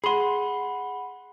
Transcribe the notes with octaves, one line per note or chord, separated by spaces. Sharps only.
G#4 F#5 B5 C6